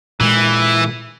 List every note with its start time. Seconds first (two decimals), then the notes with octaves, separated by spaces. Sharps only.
0.21 A#2 E3 G#3